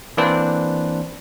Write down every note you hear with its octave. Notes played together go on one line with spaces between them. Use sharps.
E3 A#3 C4 D4 B4 C5